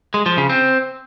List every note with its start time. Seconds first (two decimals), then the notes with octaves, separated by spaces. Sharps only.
0.14 G#3
0.26 F3
0.38 C#3
0.49 C4